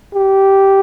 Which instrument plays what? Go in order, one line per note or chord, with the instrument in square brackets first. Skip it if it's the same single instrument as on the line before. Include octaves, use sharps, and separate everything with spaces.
[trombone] G4